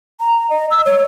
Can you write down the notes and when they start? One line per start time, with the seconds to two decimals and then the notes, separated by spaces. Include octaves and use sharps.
0.20 A#5
0.50 D#5
0.71 E6
0.86 C#5